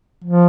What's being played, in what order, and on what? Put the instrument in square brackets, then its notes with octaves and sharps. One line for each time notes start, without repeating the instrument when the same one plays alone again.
[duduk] F3